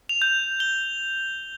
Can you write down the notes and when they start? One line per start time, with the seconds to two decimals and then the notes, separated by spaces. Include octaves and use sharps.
0.09 F7
0.22 G6
0.60 G7